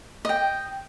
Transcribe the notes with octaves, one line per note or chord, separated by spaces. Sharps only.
D#5 G5